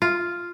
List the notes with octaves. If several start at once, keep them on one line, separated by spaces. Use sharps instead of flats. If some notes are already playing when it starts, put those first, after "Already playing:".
F4